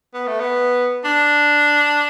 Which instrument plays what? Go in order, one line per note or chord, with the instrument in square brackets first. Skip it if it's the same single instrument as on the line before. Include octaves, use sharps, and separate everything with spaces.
[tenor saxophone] B3
A3
B3
D4